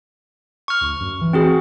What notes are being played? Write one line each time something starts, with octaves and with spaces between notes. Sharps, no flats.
C#6 F6
D2
F#2
E3
C4 F#4 G#4